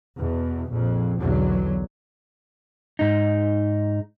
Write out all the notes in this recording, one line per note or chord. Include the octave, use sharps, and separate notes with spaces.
E2 B2
A#1 F2
B1 E2 B2 D3 F#3
G#2 D#4